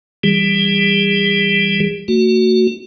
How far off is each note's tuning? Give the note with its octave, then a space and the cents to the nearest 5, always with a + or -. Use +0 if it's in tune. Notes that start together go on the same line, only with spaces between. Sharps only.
E3 +15 G3 +10 G#4 -40
A3 +45 F#4 +0